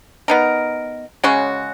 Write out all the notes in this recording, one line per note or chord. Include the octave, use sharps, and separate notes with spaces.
B3 D#4 A#4
C#3 G#3 C#4 F#4